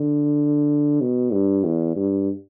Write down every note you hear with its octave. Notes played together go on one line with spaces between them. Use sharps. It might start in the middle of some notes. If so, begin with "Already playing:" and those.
Already playing: D3
B2
G2
E2
G2